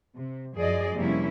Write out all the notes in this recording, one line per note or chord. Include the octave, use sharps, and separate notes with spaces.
C3
F#2 F3 G#4 D5 D#5
F2 C3 G3 A#3 C#4 E4